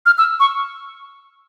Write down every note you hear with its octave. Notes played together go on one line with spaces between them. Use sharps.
F6
E6
C#6